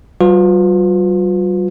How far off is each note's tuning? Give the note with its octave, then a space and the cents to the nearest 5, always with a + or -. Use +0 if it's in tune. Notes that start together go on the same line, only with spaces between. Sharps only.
G3 -45 F4 +35 B4 +30